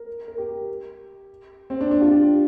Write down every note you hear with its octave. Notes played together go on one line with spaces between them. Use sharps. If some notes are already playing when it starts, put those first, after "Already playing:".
Already playing: A#4
A#4
G4
C4
D4
D4
F4
G4